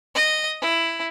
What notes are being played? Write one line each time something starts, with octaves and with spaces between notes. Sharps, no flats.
D#5
E4